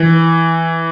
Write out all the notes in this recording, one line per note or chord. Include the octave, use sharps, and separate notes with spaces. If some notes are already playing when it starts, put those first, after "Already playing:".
Already playing: E3